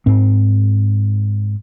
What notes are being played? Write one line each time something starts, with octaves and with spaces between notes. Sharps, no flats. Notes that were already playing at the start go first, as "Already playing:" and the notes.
G#2 C4